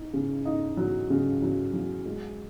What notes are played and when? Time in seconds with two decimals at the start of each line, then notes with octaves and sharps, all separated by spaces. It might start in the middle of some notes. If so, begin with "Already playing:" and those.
Already playing: D#4
0.13 C#3
0.45 D#4
0.77 F#3
1.10 C#3
1.42 F#3
1.74 F#3
2.05 G#3